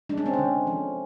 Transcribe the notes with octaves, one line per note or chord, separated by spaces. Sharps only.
G#3 D4
C#4
C4
D3 C#4
F3